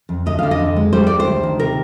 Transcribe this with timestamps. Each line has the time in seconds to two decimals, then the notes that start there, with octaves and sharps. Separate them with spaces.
0.09 F2
0.26 D2 D#5
0.39 D3 F5
0.51 D#5
0.59 F2
0.76 G#3
0.93 G3 C5
1.07 G3 D5
1.20 C5
1.26 D2
1.43 D#3
1.60 C3 A#4